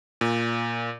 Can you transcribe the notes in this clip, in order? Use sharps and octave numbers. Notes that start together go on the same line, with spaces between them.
A#2